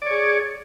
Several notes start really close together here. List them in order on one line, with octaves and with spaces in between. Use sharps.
D5 C#5 G#4